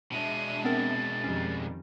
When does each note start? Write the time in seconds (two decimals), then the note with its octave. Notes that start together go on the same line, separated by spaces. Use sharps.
0.12 B2 G#3 D4 E5 D#7
0.64 B3 C4 A#4 A6
1.24 F2 D#3 G3 C#4